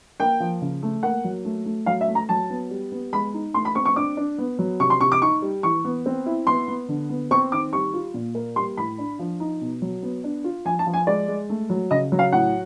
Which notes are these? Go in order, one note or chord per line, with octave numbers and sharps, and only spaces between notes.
A#3 G5
F3
C#3
A3
A#3 F#5
F#3
A3
A3
F#3 F5
E5
A3
A#5
F#3 A5
B3
G3
B3
G#3 B5
D#4
A3 C6
B5
C4 C#6
C#6
D4 D6
D4
B3
F#3
C3 C#6
C6
C3 C#6
D6
D#4 C#6
G3
E3 C#6
B3
C4
E4
B3 C6
B3
D3
B3
C4 C#6
D#3 D6
G3 C#6
F4
A#2
A#3
G3 C6
A2 B5
D4
F3
D#4
B2
F#3
B3
D4
F4
F3 G#5
A5
F3
G#5
G#3 D5
G#3
A3
F#3
C#3 D#5
F#3
F5
A2 F#5